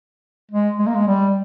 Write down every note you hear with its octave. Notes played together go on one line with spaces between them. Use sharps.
G#3
G#3
A#3
G#3
G3